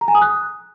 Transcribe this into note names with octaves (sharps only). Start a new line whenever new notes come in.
A#5
G#5
D#6
F#6